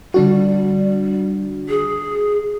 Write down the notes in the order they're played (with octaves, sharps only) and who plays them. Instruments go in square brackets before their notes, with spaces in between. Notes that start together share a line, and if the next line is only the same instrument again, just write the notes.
[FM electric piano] D3 D4 F#4 [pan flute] G3
[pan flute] G#4